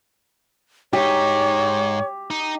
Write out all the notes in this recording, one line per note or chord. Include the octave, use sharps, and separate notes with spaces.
G#2 D#4 G4 C#5
D#4